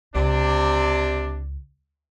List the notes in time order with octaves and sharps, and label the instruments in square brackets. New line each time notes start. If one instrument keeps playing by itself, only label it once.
[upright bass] C#2 [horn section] C3 D4